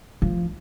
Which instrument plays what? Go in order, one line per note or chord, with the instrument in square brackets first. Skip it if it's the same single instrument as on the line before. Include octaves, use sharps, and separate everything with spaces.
[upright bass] F3